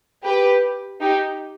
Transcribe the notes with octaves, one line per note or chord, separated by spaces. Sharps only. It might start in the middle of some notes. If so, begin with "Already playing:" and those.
G4 B4
D#4 G4